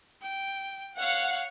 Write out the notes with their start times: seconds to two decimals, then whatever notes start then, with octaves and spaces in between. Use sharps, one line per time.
0.22 G5
0.98 C#5 F5 F#5